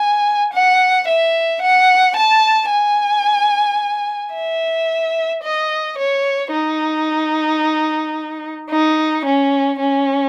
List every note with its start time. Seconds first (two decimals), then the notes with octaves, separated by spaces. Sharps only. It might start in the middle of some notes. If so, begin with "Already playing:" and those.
Already playing: G#5
0.53 F#5
1.07 E5
1.62 F#5
2.16 A5
2.71 G#5
4.34 E5
5.43 D#5
5.98 C#5
6.52 D#4
8.71 D#4
9.25 C#4
9.80 C#4